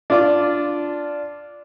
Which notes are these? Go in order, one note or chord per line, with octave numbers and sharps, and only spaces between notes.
D4 F4 D6